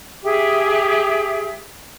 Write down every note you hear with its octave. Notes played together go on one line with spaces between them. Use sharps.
G4 G#4 E5